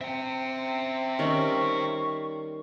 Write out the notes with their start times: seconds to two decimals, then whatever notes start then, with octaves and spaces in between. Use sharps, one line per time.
0.01 C4 E5 G5
1.19 D#3 G3 C#4 C#6